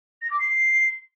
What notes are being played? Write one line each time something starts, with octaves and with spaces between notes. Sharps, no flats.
A#6
D6
C7